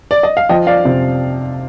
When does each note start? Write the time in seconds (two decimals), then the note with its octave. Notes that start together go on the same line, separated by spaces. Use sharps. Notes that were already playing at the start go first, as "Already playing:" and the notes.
0.11 D5
0.23 D#5
0.37 F5
0.49 F3 D#5 G5
0.67 D5 F5
0.85 C3